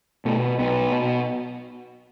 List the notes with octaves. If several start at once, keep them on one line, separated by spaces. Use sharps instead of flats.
B2 A3
B1 B3
B2